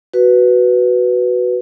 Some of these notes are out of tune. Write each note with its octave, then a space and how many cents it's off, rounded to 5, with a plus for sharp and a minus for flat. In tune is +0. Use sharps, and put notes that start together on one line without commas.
F#4 +5 B4 +0